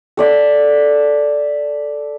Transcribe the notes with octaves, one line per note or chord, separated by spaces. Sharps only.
A4 D5 E5